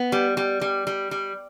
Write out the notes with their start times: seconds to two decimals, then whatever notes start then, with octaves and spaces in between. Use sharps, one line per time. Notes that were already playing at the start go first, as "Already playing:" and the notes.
Already playing: B3
0.12 G3
0.37 G3
0.61 G3
0.87 G3
1.11 G3